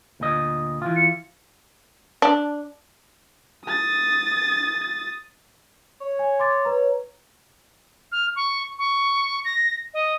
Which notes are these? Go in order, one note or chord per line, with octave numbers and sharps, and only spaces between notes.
D2 A#2 D#5
E3 F4
C#7
D4
D#6 A6
C#5
G#5
C6 D6 A6
B4 A#5
F6
C#6
C#6
A#6
D#5